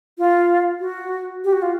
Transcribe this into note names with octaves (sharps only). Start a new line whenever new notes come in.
F4
F#4
G4
F#4
F4